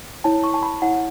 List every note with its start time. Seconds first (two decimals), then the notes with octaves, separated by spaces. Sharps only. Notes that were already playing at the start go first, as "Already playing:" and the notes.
0.24 E4 C#5 A5
0.44 C#6
0.54 A5
0.63 B5
0.82 E4 C#5 F#5